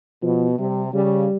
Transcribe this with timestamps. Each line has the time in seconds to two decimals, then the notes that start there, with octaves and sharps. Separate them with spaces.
0.22 B2 F3
0.58 C3 G3
0.94 C#3 G3